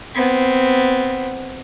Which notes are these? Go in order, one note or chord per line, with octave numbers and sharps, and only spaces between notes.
B3 C4